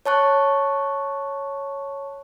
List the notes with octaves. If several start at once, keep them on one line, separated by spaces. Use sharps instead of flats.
C#5 A5 C#6 F#6